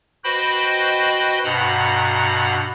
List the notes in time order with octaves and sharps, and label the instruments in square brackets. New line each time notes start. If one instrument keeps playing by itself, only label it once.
[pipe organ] F#4 B4 C5 D#5 G5 B5
G2 B2 F#5 A#5 B5